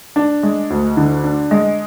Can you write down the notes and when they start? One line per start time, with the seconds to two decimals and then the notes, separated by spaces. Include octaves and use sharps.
0.16 D4
0.43 G#3
0.70 D2
0.97 D3
1.24 D4
1.51 G#3